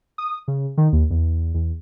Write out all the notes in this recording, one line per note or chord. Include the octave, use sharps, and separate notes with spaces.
D#6
C#3
D#3
D#2
E2
E2